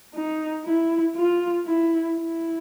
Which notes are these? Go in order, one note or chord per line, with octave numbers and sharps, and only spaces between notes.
D#4
E4
F4
E4
E4